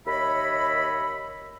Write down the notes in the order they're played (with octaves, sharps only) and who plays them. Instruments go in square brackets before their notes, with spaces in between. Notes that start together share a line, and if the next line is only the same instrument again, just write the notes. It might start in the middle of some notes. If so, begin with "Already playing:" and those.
[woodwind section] D#2 C#5 D#5 E5 B5